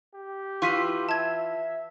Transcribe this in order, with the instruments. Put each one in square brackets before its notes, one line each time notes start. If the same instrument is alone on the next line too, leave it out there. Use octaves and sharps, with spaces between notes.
[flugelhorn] G4
[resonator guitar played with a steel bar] E3 F4 [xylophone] C#6 B6 D#7
[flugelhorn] E5 [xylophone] A5 G#6